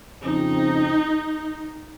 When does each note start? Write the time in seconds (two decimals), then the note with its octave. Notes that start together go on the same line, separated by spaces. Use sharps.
0.22 F2 C#3 F3 C4 D#4